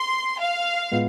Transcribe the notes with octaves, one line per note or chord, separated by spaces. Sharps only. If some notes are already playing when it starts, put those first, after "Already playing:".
Already playing: C6
F5
A2 G#3 B3 F4 B4